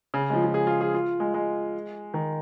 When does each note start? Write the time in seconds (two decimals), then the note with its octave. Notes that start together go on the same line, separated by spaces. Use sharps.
0.14 C#3
0.30 G#3
0.33 F3
0.44 F3
0.54 G#4
0.67 F4
0.81 G#4
0.94 F4
1.20 G#3
1.34 G#3
2.14 D#3